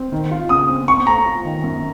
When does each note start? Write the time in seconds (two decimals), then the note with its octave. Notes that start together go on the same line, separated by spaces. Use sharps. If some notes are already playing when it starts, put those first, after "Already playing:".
Already playing: C4
0.12 D#3
0.31 F4
0.49 C#3 D#6
0.69 C4
0.88 C4 C#6
1.07 A3 A#5
1.26 F4
1.45 D#3
1.63 F#2